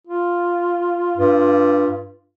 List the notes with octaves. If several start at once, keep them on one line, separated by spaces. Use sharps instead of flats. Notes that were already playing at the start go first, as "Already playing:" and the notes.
F4
G2